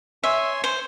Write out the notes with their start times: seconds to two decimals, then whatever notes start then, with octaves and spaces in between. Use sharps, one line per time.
0.24 C#5 E5 G#5 C6
0.64 C5